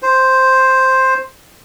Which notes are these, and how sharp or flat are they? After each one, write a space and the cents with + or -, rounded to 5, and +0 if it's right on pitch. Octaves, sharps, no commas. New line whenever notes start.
C5 +0